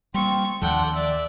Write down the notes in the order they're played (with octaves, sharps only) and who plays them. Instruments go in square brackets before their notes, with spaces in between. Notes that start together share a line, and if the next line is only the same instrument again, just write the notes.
[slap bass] G3 A#3 [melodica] C4 F4 [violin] C#6
[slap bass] D#2 F3 [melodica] D4 F4 A4 [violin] F#5 G5
[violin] D5 [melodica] E5